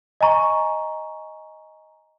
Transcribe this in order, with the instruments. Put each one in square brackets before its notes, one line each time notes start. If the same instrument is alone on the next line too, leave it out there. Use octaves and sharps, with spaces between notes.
[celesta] D#5 G#5 A#5 C#6